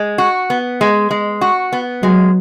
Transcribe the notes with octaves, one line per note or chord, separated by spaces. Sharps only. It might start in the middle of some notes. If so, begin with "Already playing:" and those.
Already playing: G#3
F#4
B3
G#3
G#3
F#4
B3
F#3 G#3